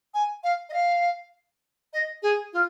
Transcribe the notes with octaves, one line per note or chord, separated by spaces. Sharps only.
G#5
F5
D#5
F5
D#5
G#4
F4